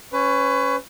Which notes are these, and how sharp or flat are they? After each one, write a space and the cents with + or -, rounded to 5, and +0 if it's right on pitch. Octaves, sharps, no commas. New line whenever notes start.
C#4 +0 B4 +30